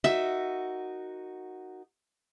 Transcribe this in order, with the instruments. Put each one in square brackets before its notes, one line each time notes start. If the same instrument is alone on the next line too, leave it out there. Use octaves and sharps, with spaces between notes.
[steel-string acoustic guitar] D#4 F#4 A#4 [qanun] E5